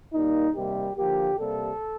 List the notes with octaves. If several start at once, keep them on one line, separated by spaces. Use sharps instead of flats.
A#2 G3 A#3 D#4
C3 D#3 G3 A#3 G4
D3 F3 A#3 G4
C3 G3 A#3 A4